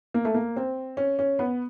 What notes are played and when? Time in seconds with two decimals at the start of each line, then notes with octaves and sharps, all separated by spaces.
0.14 A#3
0.25 A3
0.34 A#3
0.56 C4
0.97 C#4
1.19 C#4
1.39 B3